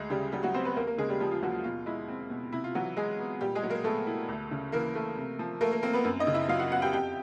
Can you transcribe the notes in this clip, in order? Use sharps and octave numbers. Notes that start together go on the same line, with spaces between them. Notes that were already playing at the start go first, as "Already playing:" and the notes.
Already playing: D2 G#3 G#4
C#3 G3 G4
F#3 G3 G4
F#3 F#4
B3 C4 C5
B3 B4
D#2 A#3 A#4
A#3 A#4
C#3 G#3 G#4
G3 G4
F3 G3 G4
F4
D#2 F#3 F#4
F4
B2 F4
G#3 E4
C4
B2
C3 E4
F4
E3 F#3 F#4
G#3 G#4
B3
A#2 G3 G4
G#3 G#4
F#3
A#3 A#4
A3 B3 A4
E4
D2
C#3
E3 A#3 A#4
A3
C3
F3
A3 A#3 A#4
A#3 A#4
A#3 C4 A#4
B3 B4
F#2
D#4 D#5
C#3
E4 E5
F#3 F4 F5
F#4 F#5
B3 F#4 F#5
G4 G5
F2 G4 G5